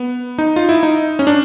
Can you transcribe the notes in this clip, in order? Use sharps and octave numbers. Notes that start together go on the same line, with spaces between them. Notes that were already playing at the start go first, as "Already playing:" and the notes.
Already playing: B3
D#4
F4
E4
D#4
C#4
D4